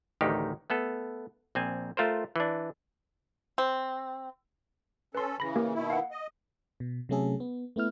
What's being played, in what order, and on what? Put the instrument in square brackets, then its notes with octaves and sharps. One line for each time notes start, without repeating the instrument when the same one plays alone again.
[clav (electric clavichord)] A1 D2 D#3 D#4 G4 C#5
A3 B3 A4
A#1 C4 G#5
A3 F4 A#4 C5
E3 D4
[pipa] C4
[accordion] C#4 A4 [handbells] B4 C6
[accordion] C#3 E3 [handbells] B5 A#6
[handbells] A#3 G4 A#4
[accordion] B2 D#3 E4
[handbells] F5 F#5
[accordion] D#5
[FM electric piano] B2
C3 F#3 A3 C#4 G#4 A4
B3
A3 B3 E4 F6